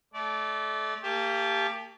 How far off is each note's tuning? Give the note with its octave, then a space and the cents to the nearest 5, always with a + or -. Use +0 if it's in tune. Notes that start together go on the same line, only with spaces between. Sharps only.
A3 -30 D5 -20
A#3 -35 G4 +15 A5 -30